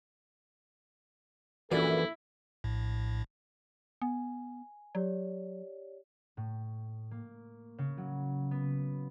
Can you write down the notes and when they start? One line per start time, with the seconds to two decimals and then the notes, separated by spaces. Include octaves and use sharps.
1.72 A#1 F#2 E3 E4 A4 D5
2.64 A#1 A2
4.02 B3 G#5
4.95 F#3 G4 C#5 D5
6.37 A2
7.11 A#3
7.78 C#3
7.97 F#3
8.51 B3